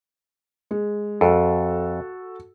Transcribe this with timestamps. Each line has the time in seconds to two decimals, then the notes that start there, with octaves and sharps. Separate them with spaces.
0.71 G#3
1.21 F2 F#4 A4